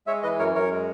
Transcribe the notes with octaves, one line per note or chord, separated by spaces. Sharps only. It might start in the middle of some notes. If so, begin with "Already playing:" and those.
G#3 C#5 E5
E3 B4 D#5
F#2 A#4 C#5
F#2 A#4 C#5
G#3